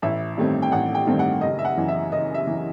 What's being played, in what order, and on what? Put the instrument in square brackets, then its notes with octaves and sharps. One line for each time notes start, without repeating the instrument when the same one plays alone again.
[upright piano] A1 E5
G2 D#3 A3 C4
G5
A1 F#5
G5
G2 D#3 A3 C4
F#5
F#1 D#5
E5
F#5
F#2 E3
E5
F#1 D#5
E5
E3